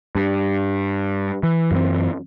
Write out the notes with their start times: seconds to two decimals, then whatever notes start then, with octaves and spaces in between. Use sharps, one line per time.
0.15 G2
1.43 E3
1.71 F#2 E3 A#3 C4